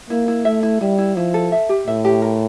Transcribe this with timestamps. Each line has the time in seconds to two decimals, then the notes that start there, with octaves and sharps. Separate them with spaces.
0.10 A#3 E4
0.28 E4
0.45 A3 E5
0.63 E4
0.81 G3 E4
0.98 E4
1.16 F3 E4
1.34 A4
1.52 E5
1.69 G4
1.87 A2 E5
2.05 G4
2.22 A#4